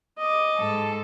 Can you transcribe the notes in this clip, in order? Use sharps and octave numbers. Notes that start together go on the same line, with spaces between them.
D#5 D6
G#2 A4